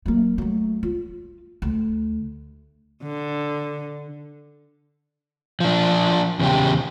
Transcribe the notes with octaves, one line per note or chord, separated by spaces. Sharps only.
F#3 A#3
F#3 A3
F4
D2
D3
F3 D4
E2 C#3 G4